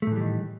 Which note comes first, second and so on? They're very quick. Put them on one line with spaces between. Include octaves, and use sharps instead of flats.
A3 A2 E3 G3 D#3